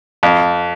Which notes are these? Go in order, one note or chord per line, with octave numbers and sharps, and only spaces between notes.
F2